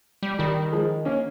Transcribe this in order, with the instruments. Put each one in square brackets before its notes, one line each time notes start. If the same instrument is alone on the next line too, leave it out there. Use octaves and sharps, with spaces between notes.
[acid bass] G3
[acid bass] D#3 [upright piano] G3
[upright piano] F3 G#3
A#3 C#4